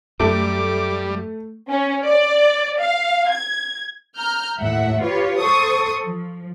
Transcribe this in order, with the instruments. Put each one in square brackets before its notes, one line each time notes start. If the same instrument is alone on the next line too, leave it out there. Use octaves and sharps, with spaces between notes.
[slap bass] F#2 [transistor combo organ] G3 [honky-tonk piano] A3 [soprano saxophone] D6
[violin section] C#4
D5
F5
G#6
[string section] A#5 F6 G6
D#2 A2 E5 F#5
F4 G4 B4 C#5
A4 C5 C#6 D#6
F3